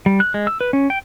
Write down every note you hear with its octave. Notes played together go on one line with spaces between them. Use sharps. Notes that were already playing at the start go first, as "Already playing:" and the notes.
G3
F#6
G#3
E6
B4
C#4
G5